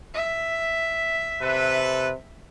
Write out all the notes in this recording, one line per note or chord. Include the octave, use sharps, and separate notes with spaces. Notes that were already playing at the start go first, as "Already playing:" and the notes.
E5
C3 A4 B4